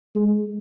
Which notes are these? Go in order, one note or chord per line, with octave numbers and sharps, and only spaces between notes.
G#3